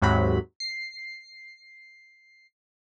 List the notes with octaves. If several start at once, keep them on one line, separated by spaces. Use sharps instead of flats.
D#2 G#2 C3 F#3 B5
C7